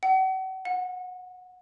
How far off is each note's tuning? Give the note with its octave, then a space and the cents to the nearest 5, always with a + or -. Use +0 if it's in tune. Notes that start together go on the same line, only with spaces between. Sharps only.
F#5 +40
F#5 -25